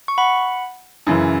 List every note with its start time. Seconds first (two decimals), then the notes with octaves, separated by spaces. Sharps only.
0.08 C#6
0.18 F#5 B5
1.07 F#2 C#3 E3